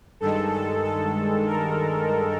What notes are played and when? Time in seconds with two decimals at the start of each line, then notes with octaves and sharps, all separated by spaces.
0.20 G2 D#3 G#3 A4
0.52 A4
0.84 A4
1.47 A#4